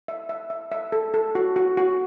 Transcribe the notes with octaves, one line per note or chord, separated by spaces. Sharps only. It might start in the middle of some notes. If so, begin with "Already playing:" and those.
E5
E5
E5
E5
A4
A4
F#4
F#4
F#4